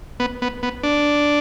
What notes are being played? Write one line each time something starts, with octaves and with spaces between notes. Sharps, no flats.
B3
B3
B3
D4